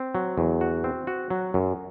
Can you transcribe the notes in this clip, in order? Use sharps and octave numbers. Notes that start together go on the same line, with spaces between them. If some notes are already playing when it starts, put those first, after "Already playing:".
Already playing: C4
F#3
E2
F#4
C4
F#4
F#3
F#2